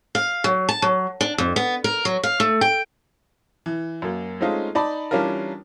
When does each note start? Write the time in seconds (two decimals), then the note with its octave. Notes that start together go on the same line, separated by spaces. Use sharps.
0.15 F5
0.44 F#3
0.69 A5
0.82 F#3
1.21 D4
1.38 F2
1.56 B3
1.84 A#4
2.05 F#3
2.23 F5
2.40 A3
2.61 G5
3.66 E3
4.02 F#2 A#3
4.41 G#3 A3 C4 C#4 D#4 F4
4.75 D#4 D5 A5 B5
5.11 E3 G3 C#4 D4 F4 A#4